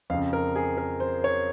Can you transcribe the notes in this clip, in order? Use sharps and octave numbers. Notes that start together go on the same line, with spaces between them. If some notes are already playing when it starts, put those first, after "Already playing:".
F2 C#3 F5
A#4
G#4
A#4
C5
C#5